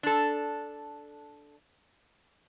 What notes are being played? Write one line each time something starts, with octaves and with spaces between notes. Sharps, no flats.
D4 A4